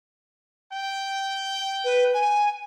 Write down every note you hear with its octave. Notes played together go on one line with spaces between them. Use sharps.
G5
B4
G#5